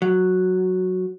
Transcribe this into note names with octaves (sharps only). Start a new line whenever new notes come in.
F#3